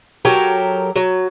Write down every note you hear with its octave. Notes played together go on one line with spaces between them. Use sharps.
F#3 G4 A4 A#4
F#3